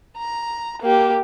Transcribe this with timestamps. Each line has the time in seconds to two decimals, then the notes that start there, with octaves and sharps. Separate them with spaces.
0.18 A#5
0.82 A#3 G4